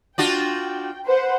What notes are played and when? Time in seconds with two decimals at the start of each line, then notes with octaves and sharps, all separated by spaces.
0.18 D4 F4 F#4 G5
1.06 B4 C5 F#5